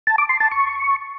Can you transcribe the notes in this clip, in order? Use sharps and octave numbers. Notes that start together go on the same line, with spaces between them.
A5
D6
C6
A5
C#6